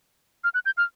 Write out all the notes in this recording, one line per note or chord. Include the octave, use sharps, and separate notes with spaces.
F6
F#6
G6
F6